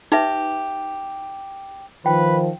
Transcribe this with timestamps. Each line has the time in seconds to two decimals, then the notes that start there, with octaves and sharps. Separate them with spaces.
0.12 D#4 G4 B4 E5
2.06 D#3 F3 B4 G5